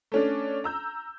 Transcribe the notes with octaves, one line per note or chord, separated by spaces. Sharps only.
A3 C#4 D4
A#5 E6 G6